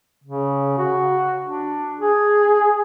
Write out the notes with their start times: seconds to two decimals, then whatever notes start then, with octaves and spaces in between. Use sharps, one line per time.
0.24 C#3
0.78 F#4
1.44 D4
2.00 G#4